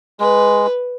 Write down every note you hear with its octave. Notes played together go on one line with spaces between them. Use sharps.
G#3 B4